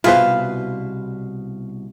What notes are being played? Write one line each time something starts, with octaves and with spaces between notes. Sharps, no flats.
C2 B2 E4 F4 G#4 B4 C5 F5